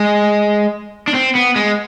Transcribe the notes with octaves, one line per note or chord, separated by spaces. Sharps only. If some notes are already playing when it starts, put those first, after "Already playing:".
Already playing: G#3
D4
C4
B3
G#3